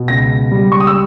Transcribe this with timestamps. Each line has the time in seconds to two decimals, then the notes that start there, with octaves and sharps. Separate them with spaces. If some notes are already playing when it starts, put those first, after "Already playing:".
Already playing: B2
0.08 C#2 A#6
0.51 G3
0.72 C#6
0.80 D#6
0.87 E6